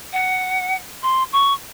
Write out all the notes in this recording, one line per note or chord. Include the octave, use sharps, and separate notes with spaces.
F#5
C6
C#6